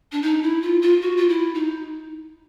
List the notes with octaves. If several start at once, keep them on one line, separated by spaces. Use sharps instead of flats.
D4
D#4
E4
F4
F4
F#4
F4
E4
D#4